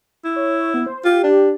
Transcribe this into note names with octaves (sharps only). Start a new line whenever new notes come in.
E4
C#5
B3
C5
F4 G4
D4